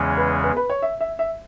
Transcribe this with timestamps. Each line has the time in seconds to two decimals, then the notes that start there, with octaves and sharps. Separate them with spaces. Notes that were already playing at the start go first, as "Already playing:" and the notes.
Already playing: E2 C#3 E3 G#3 C#4
0.17 B4
0.44 B4
0.57 B4
0.70 C#5
0.82 E5
1.01 E5
1.19 E5